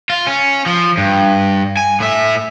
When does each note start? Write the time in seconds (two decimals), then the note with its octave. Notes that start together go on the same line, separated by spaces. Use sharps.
0.10 F4
0.27 C#4
0.66 F3
0.98 G2
1.77 G#5
2.00 A2 E5